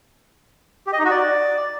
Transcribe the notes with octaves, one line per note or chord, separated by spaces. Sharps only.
G4
D#5
D#4
F#4
D5